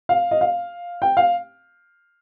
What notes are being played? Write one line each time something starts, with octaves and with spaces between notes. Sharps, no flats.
F5
D#5
F5
G5
F5